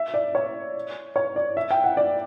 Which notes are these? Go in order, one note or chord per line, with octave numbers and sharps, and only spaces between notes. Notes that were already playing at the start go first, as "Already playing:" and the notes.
Already playing: E5
D5
C#5
C#5
D5
E5
G5
F#5
D5